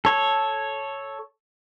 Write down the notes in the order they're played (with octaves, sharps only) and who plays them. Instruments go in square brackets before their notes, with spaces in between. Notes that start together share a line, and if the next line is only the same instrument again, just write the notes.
[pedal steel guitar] A4 C#5